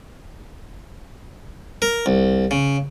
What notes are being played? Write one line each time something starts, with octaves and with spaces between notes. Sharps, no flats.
A#4
C2
C#3